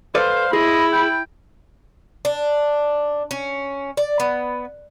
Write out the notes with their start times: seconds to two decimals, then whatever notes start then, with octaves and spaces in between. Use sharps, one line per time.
0.15 A4 B4 C5 D5 F5
0.53 E4 G#4 D#5 B5
0.93 G5
2.25 D4
3.31 C#4
3.97 D5
4.20 B3